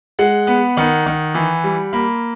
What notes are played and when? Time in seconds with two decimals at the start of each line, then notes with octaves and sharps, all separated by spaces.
0.19 G#3 F#5
0.47 B3
0.77 D#3 F#5
1.06 D#3
1.34 E3
1.64 G3
1.93 A#3 B5